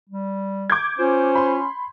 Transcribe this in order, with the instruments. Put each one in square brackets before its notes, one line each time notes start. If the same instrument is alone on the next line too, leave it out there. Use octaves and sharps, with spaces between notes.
[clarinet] G3
[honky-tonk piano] D6 G6 G#6
[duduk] C#4 [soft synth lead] F4 [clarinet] C5
[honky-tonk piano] B5 C6